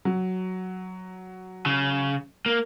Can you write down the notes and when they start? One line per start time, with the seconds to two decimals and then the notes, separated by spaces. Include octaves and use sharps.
0.05 F#3
1.66 C#3
2.46 A#3